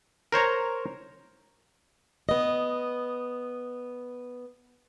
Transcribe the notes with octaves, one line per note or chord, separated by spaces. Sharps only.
A#4 C5 C#5 A#5
B3 D#5